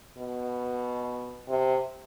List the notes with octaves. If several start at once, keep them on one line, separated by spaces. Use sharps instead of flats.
B2
C3